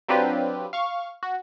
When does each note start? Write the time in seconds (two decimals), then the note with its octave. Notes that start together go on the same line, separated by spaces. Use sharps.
0.09 F#3 C4 D4 F4 G4 B4
0.73 F5 C#6
1.23 F#4